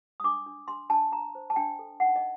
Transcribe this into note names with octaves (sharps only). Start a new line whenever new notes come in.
D#6
D4 D6
D4
D4 C6
D4 A5
D4 A#5
C5
A5
D4 G5
A4
D#4 F#5
D#5